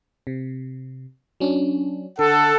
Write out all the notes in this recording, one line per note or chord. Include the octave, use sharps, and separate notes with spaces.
C3
F#3 C#4 D4
D3 A4 F#5